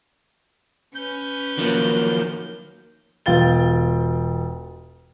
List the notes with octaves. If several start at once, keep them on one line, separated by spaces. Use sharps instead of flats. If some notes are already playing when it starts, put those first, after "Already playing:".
C#4 B4 G6
D#3 F3 F#3 A#3
E1 B3 F4 G5 A6 G7